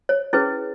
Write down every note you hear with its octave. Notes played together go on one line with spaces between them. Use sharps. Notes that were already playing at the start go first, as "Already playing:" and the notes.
C#5
C#4 E4 G#4 B4